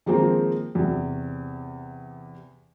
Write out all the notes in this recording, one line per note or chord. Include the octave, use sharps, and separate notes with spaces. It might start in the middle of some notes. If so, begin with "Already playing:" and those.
D#3 F3 G#3 A#3 C4
E2 C3